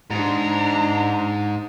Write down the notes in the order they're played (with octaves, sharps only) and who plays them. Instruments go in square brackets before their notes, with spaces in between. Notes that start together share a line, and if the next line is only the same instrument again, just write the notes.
[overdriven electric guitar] G#2 [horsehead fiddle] D4 A#5